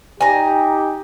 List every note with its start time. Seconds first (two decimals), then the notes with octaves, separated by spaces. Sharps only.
0.21 D#4 G4 G#5 A#5